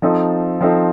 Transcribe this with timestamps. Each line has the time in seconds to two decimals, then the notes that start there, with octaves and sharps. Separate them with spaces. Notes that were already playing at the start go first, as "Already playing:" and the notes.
0.02 F3 C4 D#4 A4
0.61 F3 C4 D#4 A4